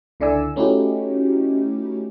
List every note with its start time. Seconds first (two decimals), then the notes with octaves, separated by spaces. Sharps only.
0.20 C#2 D3 E4 D5 G#5 E6
0.56 A3 C#4 D#4 E4 F#4 G4